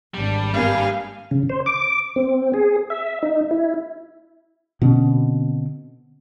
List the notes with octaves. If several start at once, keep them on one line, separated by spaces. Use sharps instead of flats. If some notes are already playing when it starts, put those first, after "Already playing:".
G#1 G3 D4
G2 A#3 F5 G#5
C#3
C5
D6
C4
G#4
E5
D#4
E4
B2 D3 C4 C#4